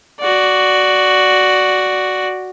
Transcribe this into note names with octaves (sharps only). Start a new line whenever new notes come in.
F#4 D5